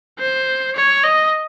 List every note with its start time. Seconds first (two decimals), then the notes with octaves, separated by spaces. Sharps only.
0.19 C5
0.76 C#5
1.04 D#5